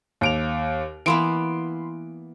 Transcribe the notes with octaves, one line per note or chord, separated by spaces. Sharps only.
D#2 D7 F7
E3 A#3 B3 B5 C6 D7